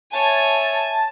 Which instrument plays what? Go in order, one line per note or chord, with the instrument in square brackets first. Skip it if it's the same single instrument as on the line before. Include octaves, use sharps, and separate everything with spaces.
[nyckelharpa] C#5 [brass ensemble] E5 [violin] G#5 [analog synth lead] A5